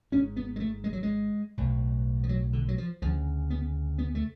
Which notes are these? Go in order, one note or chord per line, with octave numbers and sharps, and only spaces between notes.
G#1 G#2 C#4
B3
G#3
A3
G#3
F#3
G#3
B1 A2
F3
F#3
D3
F#3
F3
D2 C#3 F3
B3
B3
A3